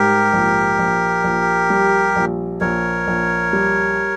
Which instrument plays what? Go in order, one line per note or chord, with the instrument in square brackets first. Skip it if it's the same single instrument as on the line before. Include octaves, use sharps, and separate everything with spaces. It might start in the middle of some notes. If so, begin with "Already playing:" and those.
Already playing: [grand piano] G#2 G3 [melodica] G4 A#4
[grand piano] A#1
A#1
A#1
G3
A#1
[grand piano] A#1 [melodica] A#4 C#5
[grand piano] A#1
G3